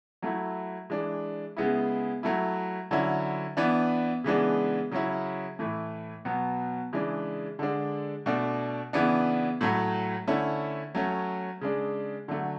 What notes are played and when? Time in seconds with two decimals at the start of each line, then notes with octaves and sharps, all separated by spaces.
0.22 F#3 A3 E4
0.90 E3 G#3 D4
1.57 C#3 G#3 B3 E4
2.23 F#3 A3 E4
2.91 D3 F#3 C#4 E4
3.57 E3 B3 D4
4.24 C#3 E3 G#3 B3 D4
4.91 C#3 F#3 C#4 E4
5.59 A2 E3 A3
6.25 B2 F#3 B3
6.93 C#3 E3 G#3 D4
7.59 D3 G#3 D4
8.26 B2 A3 D4
8.93 C#3 E3 B3 D4
9.61 A2 F#3 A3
10.27 D3 A3 C#4 E4
10.95 F#3 A3 C#4
11.61 C#3 G#3 D4
12.28 D3 F#3 A3